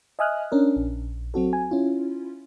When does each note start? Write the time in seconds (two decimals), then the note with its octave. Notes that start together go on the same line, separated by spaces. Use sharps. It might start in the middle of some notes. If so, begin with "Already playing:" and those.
0.19 D#5 E5 G#5 D#6 F6 F#6
0.52 C#4 D4 A#4
0.76 A#1
1.34 F#3 C4 F#4 A4
1.53 G#5
1.71 C#4 E4 F4